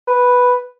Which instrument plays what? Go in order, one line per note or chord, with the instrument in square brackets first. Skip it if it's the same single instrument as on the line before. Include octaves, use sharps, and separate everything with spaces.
[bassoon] B4